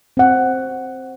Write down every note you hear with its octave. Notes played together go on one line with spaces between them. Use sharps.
C4 F#5